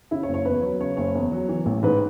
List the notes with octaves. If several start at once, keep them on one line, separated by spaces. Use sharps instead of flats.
C#3 E4
C#5
F#1
C#5
E2 B4
F#3
C#3 C#5
F#1 C#5
E2
F#3
E3
A1
G#2 B4